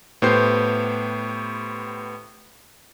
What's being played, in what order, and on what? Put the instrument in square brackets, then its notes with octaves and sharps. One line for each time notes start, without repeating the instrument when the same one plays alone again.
[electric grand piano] A2 B3 G4 C5 G6 C7